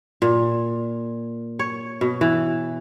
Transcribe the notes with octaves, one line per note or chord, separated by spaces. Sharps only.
A#2
C#5
B2
E3